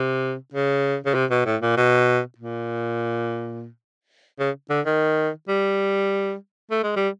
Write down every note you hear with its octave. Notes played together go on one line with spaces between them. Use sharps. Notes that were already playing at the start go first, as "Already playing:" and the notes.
Already playing: C3
C#3
C#3
C3
B2
A2
A#2
B2
A#2
C#3
D3
D#3
G3
A3
G#3
G3